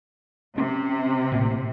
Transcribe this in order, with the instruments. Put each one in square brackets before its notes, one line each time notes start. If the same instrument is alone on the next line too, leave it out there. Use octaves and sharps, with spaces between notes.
[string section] C3 [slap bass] C4 C#4
[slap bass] A1 A2 A#3